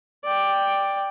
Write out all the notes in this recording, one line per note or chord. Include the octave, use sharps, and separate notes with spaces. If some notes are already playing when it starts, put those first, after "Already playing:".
D5 G5